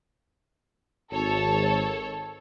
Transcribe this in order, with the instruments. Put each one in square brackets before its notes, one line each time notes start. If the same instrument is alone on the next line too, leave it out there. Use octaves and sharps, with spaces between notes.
[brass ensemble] G#1 A5 [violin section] A4 C#5